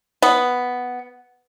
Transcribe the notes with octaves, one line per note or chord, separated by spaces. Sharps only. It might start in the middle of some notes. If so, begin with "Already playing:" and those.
B3